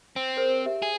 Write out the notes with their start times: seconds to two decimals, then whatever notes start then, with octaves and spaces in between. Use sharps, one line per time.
0.16 C4
0.36 G#4 A#4 C5
0.65 G4 E5
0.82 G#4